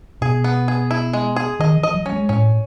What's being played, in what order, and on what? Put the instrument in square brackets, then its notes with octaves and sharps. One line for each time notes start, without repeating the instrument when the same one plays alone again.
[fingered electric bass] B2 [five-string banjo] G#4
[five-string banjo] B3
G#4
E4
G#3
G#4
[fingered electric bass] D#3 [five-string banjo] D#5
[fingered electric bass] E3
[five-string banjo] D#5
[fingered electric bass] F#3
[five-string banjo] C#4
[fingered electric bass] G#3
[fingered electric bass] A2 [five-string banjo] C#4